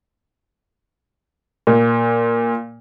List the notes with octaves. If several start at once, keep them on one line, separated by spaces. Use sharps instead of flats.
A#2